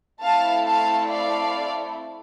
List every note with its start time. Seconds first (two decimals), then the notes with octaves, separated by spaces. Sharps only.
0.23 A3 C4 E4 A4 F5 A5
0.66 F5 A5
1.08 D5 F5